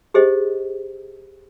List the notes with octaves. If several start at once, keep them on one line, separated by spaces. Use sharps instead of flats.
G4 G#4 C5 D#5